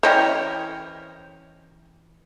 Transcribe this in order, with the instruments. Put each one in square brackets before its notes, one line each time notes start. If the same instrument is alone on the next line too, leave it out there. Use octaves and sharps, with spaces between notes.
[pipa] E3 C#4 A#4 [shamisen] C5 D#5 G5